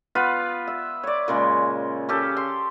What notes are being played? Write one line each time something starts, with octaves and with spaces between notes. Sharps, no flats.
B3 F4 B4
E5
C#5 D5
A#2 C#3 G#3
C#4 G4 A4
C6